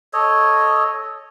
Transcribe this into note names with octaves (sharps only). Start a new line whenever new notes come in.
A4 C#5 D#5